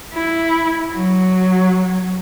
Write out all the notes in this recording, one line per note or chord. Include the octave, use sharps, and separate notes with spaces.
E4
F#3